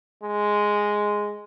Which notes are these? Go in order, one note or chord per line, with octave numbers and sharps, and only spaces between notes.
G#3